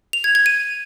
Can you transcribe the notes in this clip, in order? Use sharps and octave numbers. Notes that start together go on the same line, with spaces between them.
F7
G#6
G#6
D#7